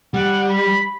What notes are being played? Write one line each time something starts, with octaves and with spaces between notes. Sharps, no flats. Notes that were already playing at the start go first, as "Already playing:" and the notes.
G3 F#5
B5